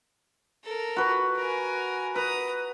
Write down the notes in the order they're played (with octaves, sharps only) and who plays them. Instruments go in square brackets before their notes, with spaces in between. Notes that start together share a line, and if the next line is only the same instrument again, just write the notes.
[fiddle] A4 A#4
[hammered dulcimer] F#4 B4
[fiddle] A#4 G#5
[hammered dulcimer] B4 [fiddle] A#5 D#6